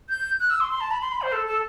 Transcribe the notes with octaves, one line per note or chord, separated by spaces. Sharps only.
G6
F#6
E6
C6
C6
A5
B5
C6
B5
C5
A4
A4